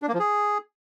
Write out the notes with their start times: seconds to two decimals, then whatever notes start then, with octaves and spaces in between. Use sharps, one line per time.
0.02 D4
0.08 A#3
0.14 F3
0.20 G#4